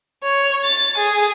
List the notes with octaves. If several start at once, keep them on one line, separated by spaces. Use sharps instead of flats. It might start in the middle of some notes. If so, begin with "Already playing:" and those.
C#5
A6
G#4